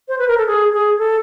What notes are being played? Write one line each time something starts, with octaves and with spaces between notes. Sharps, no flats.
C5
B4
A#4
A4
G#4
G#4
A4